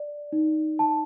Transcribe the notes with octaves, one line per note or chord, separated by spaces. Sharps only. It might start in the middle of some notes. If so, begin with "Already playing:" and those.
Already playing: D5
D#4
A5